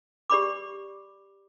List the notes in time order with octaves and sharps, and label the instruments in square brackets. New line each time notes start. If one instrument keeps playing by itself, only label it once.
[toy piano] G4 D5 B5 D6